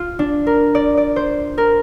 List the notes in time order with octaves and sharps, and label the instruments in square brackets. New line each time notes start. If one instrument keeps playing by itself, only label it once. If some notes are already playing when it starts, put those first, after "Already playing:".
Already playing: [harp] F4
D4
A#4
D5
D5
C5
A#4